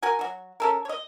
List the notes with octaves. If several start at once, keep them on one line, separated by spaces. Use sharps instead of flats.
F#4 A#4 G#5
F#3 F#4
C#4 A4 A#4
C#5 D#5